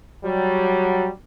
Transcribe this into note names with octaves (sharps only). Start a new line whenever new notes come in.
F#3 G3